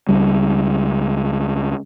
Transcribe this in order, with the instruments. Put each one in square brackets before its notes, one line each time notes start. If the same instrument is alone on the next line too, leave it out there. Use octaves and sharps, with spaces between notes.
[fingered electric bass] C#2 G3